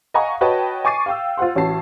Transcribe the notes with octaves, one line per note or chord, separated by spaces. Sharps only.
D#5 F5 F#5 G#5 A#5 C#6
F#4 B4 C#5 D#5 G5 A5
G#5 C#6 D6 A6 C7 D#7
F5 G5 E6
F4 C5 F#5 C6
A1 C#4 F#4 A5 C7